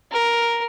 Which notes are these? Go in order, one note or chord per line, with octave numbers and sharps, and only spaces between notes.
A#4